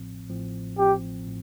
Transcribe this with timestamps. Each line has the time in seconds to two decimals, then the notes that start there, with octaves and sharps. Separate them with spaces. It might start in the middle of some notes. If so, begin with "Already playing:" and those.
Already playing: A1 A2 F3 C4
0.29 A1 A2 F3 C4
0.77 A1 A2 F3 C4 G4
1.27 A2